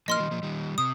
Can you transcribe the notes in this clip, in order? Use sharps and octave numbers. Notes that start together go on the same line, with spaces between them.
F3 A#3 D#5 C6 F6
D#3 G3
F3 A#3
D#3 G3
C3 D#6